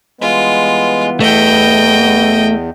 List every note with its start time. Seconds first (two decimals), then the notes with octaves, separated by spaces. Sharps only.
0.21 E3 G3 G#3 B3 F4
1.20 E2 A3 D#5 G5